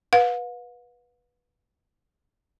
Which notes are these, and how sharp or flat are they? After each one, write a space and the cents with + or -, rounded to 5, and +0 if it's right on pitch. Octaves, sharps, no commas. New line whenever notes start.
B4 -10 F5 +45